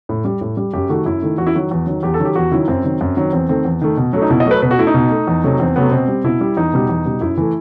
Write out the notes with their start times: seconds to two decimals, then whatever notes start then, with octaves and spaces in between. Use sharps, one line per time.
0.09 A2
0.25 G3
0.41 A2
0.57 G3
0.73 F#2 G4
0.89 D#3 A3 F#4
1.06 F#2 E4
1.22 D#3 A3
1.38 E2 F#4
1.47 E4
1.55 D#3 F#3 F#4
1.71 E2
1.87 D#3 F#3
2.03 E2 G4
2.14 A4
2.20 D#3 F#3
2.25 G4
2.35 E2 F#4
2.52 D#3 F#3 E4
2.68 F#2 C4
2.84 D#3 F#3
3.01 F#2
3.17 D#3 F#3
3.33 E2 C4
3.49 D#3 A3 C4
3.65 E2
3.82 D#3 A3
3.97 B2
4.13 F#3 A3
4.22 D#4
4.30 B2 E4
4.40 D#5
4.46 F#3 A3 B4
4.62 B2 B4
4.71 F#4
4.79 A3 E4
4.87 D#4
4.94 B2
5.11 A3
5.27 E2
5.44 C3 F#3 A3
5.59 E2 C4
5.76 C3 F#3 A3 B3
5.91 B2 C4
6.08 G3
6.24 B2 E4
6.41 G3
6.57 E2 D#4
6.73 B2 G3
6.89 E2
7.05 B2 G3
7.21 F#2 E4
7.37 E3 A3